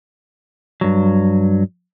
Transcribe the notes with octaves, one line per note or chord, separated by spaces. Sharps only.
G2 F#3